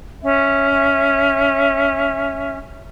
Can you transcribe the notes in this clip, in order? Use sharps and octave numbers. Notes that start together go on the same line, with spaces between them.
C#4 E5